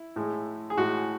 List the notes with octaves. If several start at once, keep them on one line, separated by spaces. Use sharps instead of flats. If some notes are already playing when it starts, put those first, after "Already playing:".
Already playing: E4
A2 G#3
G#4
A2 G#3 F#4